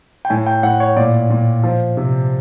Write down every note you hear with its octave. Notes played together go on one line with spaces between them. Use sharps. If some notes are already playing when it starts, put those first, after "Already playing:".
G5
A2 G#5
G5
A2 F#5
C#5
A#2 D5
A#2
F3
C3